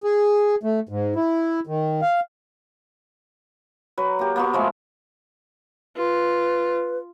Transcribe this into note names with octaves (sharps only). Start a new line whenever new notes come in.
G#4
A3
G#2
E4
D#3
F5
F#3 B4
A#3 G4
A#3 B3 F#4
F3 G#3 A3
F4 B4